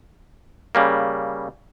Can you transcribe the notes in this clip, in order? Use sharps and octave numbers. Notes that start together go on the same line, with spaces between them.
C#3 G3 A#3